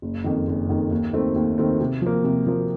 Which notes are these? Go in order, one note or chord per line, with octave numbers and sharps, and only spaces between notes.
F#1
F2 D#3
F#1
F2 D#3
D#2
D#3 A3 C4
D#2
D#3 A3 C4
C3
F3 A#3
C3
F3 A#3